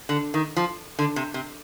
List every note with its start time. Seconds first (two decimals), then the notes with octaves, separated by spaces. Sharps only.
0.09 D3
0.34 D#3
0.57 F3
0.99 D3
1.16 C3
1.34 C3